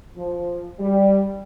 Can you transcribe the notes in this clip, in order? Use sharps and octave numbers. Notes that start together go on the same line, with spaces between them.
F3
G3